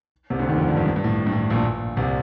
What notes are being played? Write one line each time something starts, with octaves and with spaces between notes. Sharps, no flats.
C2 C3
D2 D3
D#2 D#3
F2 F3
G2 G3
F2 F3
G2
G2
A2
G2
A2
A#1 A#2
C2 C3